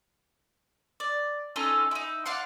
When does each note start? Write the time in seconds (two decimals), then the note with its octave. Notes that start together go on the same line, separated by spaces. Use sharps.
1.00 D5
1.56 C#4 D#4 F4 A4
1.91 D#4 E4
2.26 D5 F5 F#5 C6